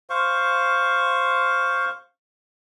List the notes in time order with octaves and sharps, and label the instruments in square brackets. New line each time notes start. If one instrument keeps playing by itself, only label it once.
[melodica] C5 F5 C#6